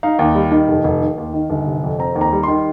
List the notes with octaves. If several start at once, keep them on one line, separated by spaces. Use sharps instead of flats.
D#4 F5
D#2
G3
D#3
F1
F1
D#3
D#2
D#3
G1
C3
F2
C4 A#5
D#2
A#5
G3
D#3 C6